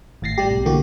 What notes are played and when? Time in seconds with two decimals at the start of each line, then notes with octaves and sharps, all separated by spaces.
0.22 G#1 A2 A6 A#6 C7
0.38 G3 G4
0.51 B1
0.65 D3 E3 A#3 F#4 G4